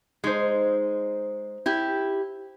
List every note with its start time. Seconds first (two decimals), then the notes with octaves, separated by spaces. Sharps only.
0.24 G#3 D#4 C5
1.66 E4 G4